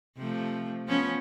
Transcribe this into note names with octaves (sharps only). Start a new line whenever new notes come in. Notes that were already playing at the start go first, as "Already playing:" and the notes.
C3 F3 A3
F3 B3 C#4